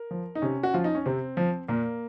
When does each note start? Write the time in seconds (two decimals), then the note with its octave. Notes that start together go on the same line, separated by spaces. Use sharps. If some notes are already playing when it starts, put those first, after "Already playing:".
Already playing: A#4
0.11 F3
0.35 D#4
0.42 C3 C#4
0.63 F#4
0.74 F3 F4
0.84 D#4
0.95 C#4
1.06 C3 C4
1.37 F3
1.68 A#2 A#3